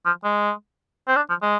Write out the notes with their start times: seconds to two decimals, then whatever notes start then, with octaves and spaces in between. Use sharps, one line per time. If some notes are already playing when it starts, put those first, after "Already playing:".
0.06 F3
0.24 G#3
1.08 C4
1.16 D4
1.29 F3
1.42 G#3